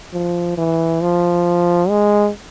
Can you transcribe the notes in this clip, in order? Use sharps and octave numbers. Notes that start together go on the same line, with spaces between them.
F3
E3
F3
G#3